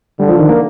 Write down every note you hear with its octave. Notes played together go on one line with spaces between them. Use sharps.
D3 G3
F3
D#3
A#3